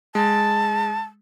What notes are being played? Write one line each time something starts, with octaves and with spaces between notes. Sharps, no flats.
G#3 A5